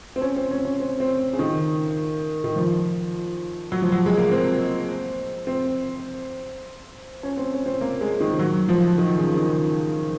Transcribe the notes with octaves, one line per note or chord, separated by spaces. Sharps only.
C4
C#4
C4
C#4
C#4
C4
C4
C#3
D#3
D#3
F3
F#3
F3
F#3
G#3
A#3
C4
C4
C#4
C4
C#4
C4
A#3
G#3
D#3
F#3
F3
D#3
C#3
D#3